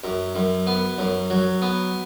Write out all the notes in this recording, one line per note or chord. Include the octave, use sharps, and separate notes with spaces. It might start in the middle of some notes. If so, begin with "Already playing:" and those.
F#2
F#2
B3
F#2
F#3
B3